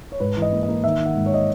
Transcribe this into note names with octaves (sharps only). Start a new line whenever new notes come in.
C#5
G#2 B4
E3
D#5
A#3
D#5
A#3
D#3 E5
D#3
F#5
G#2
C#5
D#5